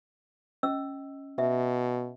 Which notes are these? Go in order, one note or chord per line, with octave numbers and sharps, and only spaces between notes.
C#4 D#5 E6
B2 E5